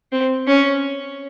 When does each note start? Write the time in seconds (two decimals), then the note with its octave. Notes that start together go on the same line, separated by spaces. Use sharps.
0.12 C4
0.47 C#4